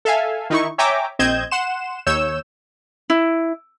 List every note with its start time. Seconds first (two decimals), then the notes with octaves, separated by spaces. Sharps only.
0.05 A4 E5 F5 G#5
0.50 D#3 D#4 E4 C#6
0.78 C#5 E5 G5 G#5 A#5 D6
1.19 A#1 C4 D#5 G6 G#6 E7
1.51 F#5 C6 E7
2.07 D#2 C#5 E6 G6 E7
3.10 E4